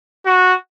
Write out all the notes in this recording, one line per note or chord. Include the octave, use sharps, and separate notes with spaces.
F#4